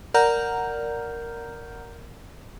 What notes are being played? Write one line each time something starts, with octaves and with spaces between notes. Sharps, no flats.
A#4 D5 F#5 A#5 F6 G6